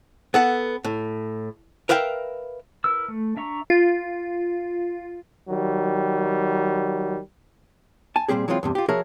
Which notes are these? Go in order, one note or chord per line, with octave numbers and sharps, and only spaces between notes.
B3 A4 F#5
A2
A#4 B4 E5 F5 G5
E4 A#4 B4 E6
A3
D4 E5 A#5 C#6
F4
D#3 F#3 G3
G#5 A5
A#2 F#3 G3 C4 G4 G#4
E3 F#3 G#3 C4 F4
E2 G2 C3
F4 G4
F3 F#4 G#4 A#4 C#5 E5